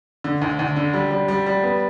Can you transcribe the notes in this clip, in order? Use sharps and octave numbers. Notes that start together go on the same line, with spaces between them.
D3
D2
D2
D3
G3
G3
G3
G3
B3